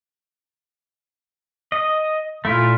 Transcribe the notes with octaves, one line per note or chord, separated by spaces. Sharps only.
D#5
A#2 A3 E4 F4